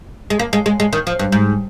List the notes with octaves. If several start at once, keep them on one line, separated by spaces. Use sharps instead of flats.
G#3
A#3
G#3
G#3
G#3
D#3
F3
G2
G#2